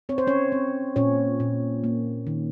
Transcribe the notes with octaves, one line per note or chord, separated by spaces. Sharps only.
C4 C#5
C5
C#4 C#5
C4
A#2 C#4 C#5
A#2
A#3
D#3